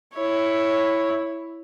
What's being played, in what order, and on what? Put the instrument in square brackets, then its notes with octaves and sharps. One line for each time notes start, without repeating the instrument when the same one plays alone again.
[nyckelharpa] E4 C#5